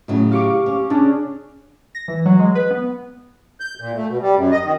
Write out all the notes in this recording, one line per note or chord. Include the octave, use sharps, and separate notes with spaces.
A2 C#3 F#3
G4 F5 C#6 D6
C#4
C#3 C#4 D4 G#4
A#6
E3
F#3
G#3
B4
B3
G6
A#2
A3
B2
G3
F#2
D#5
D#3